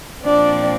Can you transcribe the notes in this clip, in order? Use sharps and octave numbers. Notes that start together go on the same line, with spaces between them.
A#2 F3 C4 D4 D5